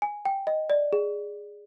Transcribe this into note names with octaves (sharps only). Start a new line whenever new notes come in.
G#5
G5
D#5
D5
G#4